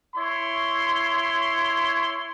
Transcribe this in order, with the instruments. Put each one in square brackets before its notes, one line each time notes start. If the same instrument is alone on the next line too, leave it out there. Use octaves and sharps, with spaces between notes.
[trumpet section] E4 C#5 C6